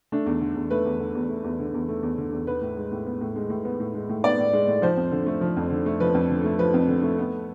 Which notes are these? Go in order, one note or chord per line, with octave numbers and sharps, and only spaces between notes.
A3 D4
E2
D3
E2
A3 B4
E2
D3
E2
A3
E2
D3
E2
A3
E2
D3
E2
B3 B4
A2
G#3
A2
B3
A2
G#3
A2
B3
A2
G#3
A2
B3 D5
A2
G#3
A2
F3 C5
F2
D3
A3
F3
F2
D3
A3
F3 B4
F2
D3
A3
F3 B4
F2
D3
A3
B3